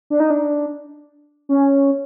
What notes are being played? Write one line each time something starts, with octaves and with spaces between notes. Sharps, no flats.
D4
D#4
D4
C#4